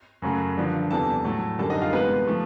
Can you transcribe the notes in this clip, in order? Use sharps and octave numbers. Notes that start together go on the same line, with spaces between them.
F#2 C#3 F#3 A3
G2 D3 F3
E2 C3 E3 G3 A4 A5
A2 F#3 A3
F#2 D3 G3 A#3 A4 A5
D#4 D#5
F4 F5
C3 E3 G#3 B3 B4
F3 A3